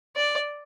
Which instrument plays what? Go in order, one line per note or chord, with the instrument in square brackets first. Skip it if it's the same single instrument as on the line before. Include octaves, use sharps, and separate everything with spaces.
[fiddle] D5